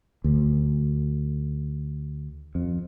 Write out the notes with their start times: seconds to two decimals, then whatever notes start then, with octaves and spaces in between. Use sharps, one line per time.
0.24 D2
2.55 F2